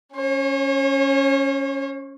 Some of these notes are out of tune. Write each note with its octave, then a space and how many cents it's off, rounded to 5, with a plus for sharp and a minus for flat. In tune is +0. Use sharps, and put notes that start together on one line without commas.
C#4 +0 C#5 -45